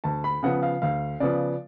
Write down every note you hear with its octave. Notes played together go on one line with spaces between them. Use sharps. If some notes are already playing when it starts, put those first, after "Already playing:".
D2 A5
B5
C#3 F3 B3 F#5
F5
D2 F5
C#3 F3 B3 D5